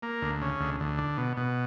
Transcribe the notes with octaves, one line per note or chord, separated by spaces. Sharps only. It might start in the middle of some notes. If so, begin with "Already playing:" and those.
A#3
D2
C#3
D2
D2
D3
B2
B2